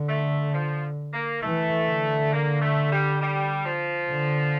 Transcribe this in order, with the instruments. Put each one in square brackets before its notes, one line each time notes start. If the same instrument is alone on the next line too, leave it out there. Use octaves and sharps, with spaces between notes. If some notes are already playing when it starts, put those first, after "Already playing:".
Already playing: [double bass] D3
[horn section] A3
F3
A#3
[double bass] E3 [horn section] A3
[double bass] D3
[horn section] A#3
A3
G3
G3
F3
[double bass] D3